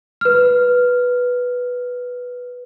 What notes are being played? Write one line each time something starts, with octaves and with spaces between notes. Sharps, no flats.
B4 F6